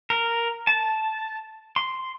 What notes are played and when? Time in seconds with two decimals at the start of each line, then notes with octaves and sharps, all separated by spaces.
0.10 A#4
0.67 A5
1.76 C6